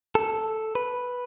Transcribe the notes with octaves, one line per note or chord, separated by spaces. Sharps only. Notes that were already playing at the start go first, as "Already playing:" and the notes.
A4
B4